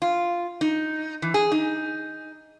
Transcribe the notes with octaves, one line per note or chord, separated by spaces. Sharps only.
F4
D#4
E3
G#4
D#4